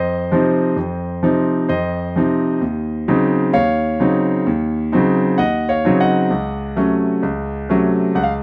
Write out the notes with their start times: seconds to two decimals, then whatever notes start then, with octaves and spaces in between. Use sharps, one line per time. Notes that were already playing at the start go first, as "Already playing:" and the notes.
Already playing: F2 C5 D#5
0.31 C3 F3 C4 D#4
0.77 F2
1.23 C3 F3 C4 D#4
1.69 F2 C5 D#5
2.16 C3 F3 C4 D#4
2.61 D#2
3.08 C#3 F#3 C4 D#4
3.53 D#2 C#5 F5
4.00 C#3 F#3 C4 D#4
4.46 D#2
4.92 C#3 F#3 C4 D#4
5.38 D#2 D#5 F#5
5.69 C#5 F5
5.85 C#3 F#3 C4 D#4
6.00 D#5 F#5
6.30 C#2
6.76 C3 F#3 A3 C#4
7.23 C#2
7.69 C3 F#3 A3 C#4
8.15 C#2 F#5
8.23 F5